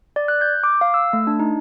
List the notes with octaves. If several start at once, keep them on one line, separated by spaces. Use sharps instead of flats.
D5
F#6
G6
D6
F5
E6
A3
D4
D#4